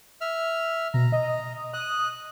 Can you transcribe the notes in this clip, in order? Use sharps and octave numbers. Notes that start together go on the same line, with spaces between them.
E5 F6
B2 A#5
D#5
D#6 F#6